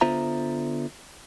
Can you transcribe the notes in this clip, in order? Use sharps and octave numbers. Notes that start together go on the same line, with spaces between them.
D3 B3 F4 C5 E5 A#5